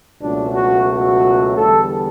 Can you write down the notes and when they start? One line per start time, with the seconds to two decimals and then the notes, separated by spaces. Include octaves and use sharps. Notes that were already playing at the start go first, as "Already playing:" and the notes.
0.20 C#2 B2 F#3 A3 D4
0.54 F#4
0.89 F#4
1.56 E2 D3 G3 A4